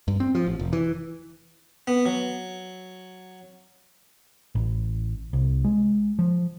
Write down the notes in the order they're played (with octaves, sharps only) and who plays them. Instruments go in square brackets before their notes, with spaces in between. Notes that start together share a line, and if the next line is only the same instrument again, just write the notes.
[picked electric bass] G2
C4
F3
A1
F1
E3
[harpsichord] B3
F#3
[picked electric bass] A1
C2
G#3
F3